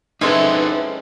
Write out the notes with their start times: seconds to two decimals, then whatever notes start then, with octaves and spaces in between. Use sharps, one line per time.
0.21 G#3 C4 C#4 D#4 E4 A4 B4 D5